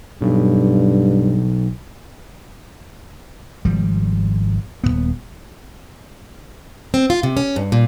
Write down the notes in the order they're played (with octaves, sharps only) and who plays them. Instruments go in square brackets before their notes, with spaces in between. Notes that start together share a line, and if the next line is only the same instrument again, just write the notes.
[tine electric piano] B1 [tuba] G2
[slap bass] G#1 F3 G3
D#1 E2 B3
[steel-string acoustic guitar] C4
F4
C3
C#4
G2
A#2